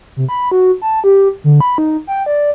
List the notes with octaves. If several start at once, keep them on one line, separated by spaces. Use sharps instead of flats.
C3
B5
F#4
A5
G4
D3
B5
D#4
G5
D5